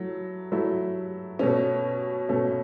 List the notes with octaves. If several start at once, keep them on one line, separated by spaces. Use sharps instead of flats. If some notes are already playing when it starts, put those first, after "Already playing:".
Already playing: F#3 A3 E4
F#3 A3 E4
B2 A3 C#4
B2 A3 C#4